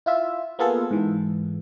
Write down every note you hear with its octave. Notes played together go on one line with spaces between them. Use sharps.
E4 F4 E5
A#3 B3 F4 G#4 A4
G#2 E3